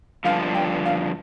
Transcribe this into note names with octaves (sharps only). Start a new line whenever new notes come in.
G2 D3 F3 F5
G5
F5